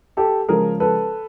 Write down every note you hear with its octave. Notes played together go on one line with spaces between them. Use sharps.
G4 A4
C#3 F3 G#3 G#4 A#4
A4 B4